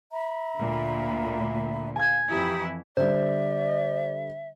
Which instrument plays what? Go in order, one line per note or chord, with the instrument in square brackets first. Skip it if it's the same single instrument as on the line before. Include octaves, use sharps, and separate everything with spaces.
[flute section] E5 A#5 B5
[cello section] D2 A#2 D3
[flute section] F5 [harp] G#5 G#6
[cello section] F2 E3 E4 [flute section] G4 A#5 D#6
[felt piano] D3 G3 [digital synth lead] C5 [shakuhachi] D5 [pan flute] E5